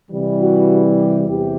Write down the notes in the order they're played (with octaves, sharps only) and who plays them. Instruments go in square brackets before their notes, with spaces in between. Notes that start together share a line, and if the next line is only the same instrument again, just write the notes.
[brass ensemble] C3 E3 G3
F#4
G4
E2 C3 E3 G4